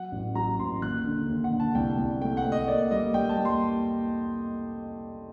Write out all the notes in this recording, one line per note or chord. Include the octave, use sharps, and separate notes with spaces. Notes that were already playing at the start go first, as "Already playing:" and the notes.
Already playing: F#3 F#5
A1
F#3 A#5
A1 C6
D#2 F#6
D3
D#2
F#5
D3
A5
C2 G5
C2
A3 G5
F#5
A3
D#5
A#3 D5
G3 D#5
G3 G5
A5
G3
C6